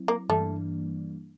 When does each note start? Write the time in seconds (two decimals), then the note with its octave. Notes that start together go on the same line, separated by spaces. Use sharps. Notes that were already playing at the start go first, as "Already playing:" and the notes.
Already playing: F#3 C4 E4
0.08 A#3
0.29 G2 E3 G3 A3 A#3 D4